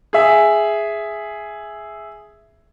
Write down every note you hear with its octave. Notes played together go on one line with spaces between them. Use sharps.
G#4 E5